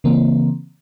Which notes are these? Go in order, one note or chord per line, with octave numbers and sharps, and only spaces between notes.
C#3 E3 A#3 C4